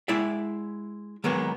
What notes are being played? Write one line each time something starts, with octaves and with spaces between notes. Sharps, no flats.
G#3 E4 D5 E5
D#3 F#3 G#3 A#3 B3